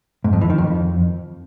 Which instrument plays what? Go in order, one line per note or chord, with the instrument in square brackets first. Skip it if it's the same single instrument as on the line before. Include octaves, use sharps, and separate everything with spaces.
[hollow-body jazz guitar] G#2
F2
E3
D#3
F2